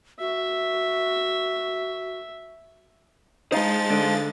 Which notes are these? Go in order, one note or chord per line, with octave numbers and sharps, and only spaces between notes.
F#4 E5
G#3 D#4 C5 F5 A6
D3